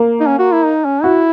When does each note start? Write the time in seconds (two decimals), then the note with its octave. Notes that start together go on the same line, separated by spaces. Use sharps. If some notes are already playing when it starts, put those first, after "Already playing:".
Already playing: A#3
0.21 D#4
0.27 C#4
0.39 F#4
0.52 E4
0.65 D#4
0.84 C#4
1.03 E4 F#4